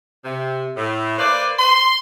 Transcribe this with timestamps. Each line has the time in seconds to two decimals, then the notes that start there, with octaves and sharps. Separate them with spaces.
0.25 C3
0.77 A2
1.19 A#3 B4 C5 D5
1.59 C6